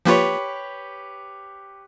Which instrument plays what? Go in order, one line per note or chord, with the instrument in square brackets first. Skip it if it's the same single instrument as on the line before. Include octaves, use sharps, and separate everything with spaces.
[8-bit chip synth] F3 A#3 F4 [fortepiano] G4 B4 C#5